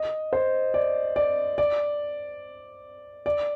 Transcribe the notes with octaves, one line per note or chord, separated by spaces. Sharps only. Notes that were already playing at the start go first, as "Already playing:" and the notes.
Already playing: D#5
C5
D5
D5
D5
D5